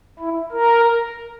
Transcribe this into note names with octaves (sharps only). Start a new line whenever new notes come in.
E4
A#4